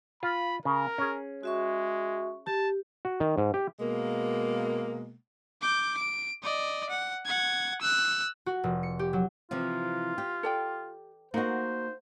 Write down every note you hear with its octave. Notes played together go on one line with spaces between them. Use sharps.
F4 B5
C#3 A#4
C#4 G#4
G#3 F#4 E5 C#6
G4 A5
F#4
D#3
G#2
G4
B2 G#3 A#3
D6 G6
D7
D5 D#5
F#5
F#5 G#6
E6 F#6
F#4
F1
C#7
G4
F#3
C3 E3 F3 F4
G4
A4 D5 G5
A#3 D#4 F#4 C5 D#5